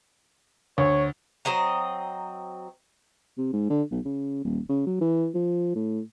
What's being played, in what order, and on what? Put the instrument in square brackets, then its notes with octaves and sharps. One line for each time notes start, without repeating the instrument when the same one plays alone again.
[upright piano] D2 [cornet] C#5
[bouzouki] F#3 C4 D#5 A#5
[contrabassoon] C3
G#2
D3
B1
C#3
D#1
C#3
F#3
E3
F3
A2